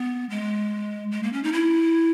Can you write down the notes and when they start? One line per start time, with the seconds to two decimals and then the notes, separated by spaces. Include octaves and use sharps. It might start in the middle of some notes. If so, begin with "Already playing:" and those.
Already playing: B3
0.30 G#3
1.12 G#3
1.23 A#3
1.33 C#4
1.44 D#4
1.53 E4